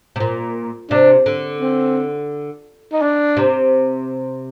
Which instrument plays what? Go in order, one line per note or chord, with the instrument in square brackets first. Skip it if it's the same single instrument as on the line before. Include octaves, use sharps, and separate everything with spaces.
[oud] C3
A#2
[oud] C3 [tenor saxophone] D4
[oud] D3
[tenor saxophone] C4
D#4
D4
[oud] C3